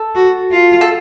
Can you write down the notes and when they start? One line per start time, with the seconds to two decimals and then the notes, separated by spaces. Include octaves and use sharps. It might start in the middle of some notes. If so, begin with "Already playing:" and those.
Already playing: A4
0.15 F#4
0.52 F4
0.81 A4